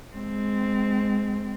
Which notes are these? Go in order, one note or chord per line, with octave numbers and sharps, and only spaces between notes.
G#3 C4